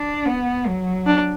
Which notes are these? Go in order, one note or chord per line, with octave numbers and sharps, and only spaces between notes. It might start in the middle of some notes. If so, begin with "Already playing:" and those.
Already playing: D4
B3
F#3
D4